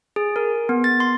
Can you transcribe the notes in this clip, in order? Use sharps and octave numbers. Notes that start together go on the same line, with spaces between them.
G#4
A#4
B3
A6
C6